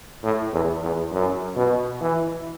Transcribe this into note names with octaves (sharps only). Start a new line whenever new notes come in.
A2
E2
E2
F#2
B2
E3